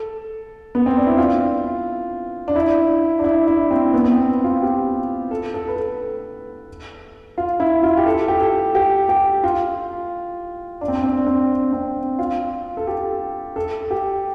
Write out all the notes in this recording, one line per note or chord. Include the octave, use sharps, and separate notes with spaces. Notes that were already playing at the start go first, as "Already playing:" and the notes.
Already playing: A4
B3
C4
D4
E4
F4
D4
E4
D4
E4
E4
C4
B3
B3
C4
F4
G4
A4
A4
B4
A4
F4
E4
F4
G4
A4
G4
A4
G4
G4
F4
D4
C4
D4
C4
C4
C4
F4
A4
G4
A4
G4